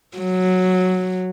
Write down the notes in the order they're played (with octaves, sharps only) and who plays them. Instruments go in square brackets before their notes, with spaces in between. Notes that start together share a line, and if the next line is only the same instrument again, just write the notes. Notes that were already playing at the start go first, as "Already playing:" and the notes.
[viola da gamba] F#3